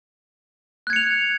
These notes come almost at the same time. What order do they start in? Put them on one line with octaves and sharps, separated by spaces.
F#6 G#6 C#7 F7